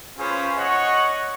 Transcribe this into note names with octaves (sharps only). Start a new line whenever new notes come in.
C#4 F4 G#4 B4 C5
C#5 D#5 F#5 C#6